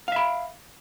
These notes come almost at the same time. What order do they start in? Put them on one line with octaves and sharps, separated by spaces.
F5 E5 B5